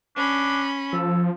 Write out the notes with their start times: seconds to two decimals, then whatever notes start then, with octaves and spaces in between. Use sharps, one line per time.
0.16 C#4 D4 B5
0.93 F3 A4